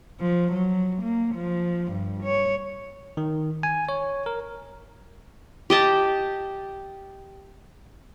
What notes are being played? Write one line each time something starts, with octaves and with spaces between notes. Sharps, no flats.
F3
F#3
A#3
F3
G2
C#5
D#3
G#5
C#5
A#4
G4 D#5 A5